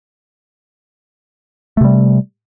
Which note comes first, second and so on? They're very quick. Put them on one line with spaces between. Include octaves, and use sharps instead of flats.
A3 C3 G3